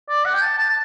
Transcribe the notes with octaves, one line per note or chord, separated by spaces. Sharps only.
D5
F#5
G5
A5
A5
A5